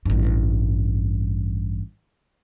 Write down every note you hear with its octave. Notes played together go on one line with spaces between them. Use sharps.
A1 G2